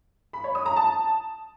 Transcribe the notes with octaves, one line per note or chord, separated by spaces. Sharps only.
B5
C#5
D#6
A#5
A5